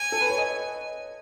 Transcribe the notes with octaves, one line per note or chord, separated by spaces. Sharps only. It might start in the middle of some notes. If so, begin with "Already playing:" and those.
Already playing: G#5
A4
B4
C#5
D#5